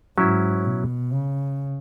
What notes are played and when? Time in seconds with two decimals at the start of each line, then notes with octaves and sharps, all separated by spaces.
0.18 G#2 F#3 C#4 E4
0.65 B2
1.12 C#3